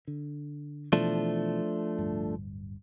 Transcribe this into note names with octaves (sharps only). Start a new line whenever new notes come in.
D3
B2 E3 F3 A3 D4
D1 G1 G2